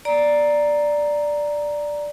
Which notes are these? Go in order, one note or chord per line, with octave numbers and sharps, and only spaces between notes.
D5 A#5